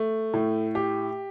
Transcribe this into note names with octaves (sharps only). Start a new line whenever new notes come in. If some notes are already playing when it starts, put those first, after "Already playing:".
Already playing: A3
A2
G4